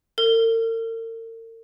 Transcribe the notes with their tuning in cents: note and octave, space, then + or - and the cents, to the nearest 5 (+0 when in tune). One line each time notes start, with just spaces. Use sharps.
A#4 -45